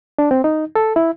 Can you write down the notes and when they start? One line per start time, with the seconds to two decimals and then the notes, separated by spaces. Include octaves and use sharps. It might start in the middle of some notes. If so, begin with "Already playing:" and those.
0.19 D4
0.31 C4
0.44 D#4
0.75 A4
0.96 E4